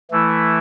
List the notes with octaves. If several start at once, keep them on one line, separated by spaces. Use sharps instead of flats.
E3 A3 E4